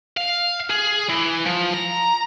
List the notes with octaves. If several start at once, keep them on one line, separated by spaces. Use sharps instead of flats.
F5
G#4
E3
F3
A#5